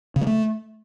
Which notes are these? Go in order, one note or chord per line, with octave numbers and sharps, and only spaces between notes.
C#3
G#3
A3